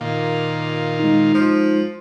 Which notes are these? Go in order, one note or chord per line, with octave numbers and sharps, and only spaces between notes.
A#2 D#3 A#3 F4
G#3 D#4
F3